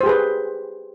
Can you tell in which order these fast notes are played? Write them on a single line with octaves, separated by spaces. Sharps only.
C5 G4 G#4 B4